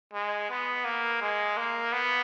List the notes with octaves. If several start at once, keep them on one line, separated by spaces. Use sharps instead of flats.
G#3
B3
A#3
G#3
A#3
B3